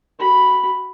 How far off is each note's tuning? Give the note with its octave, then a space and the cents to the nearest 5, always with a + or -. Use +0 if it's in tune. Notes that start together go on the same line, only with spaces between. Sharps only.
F#4 +15 B5 +0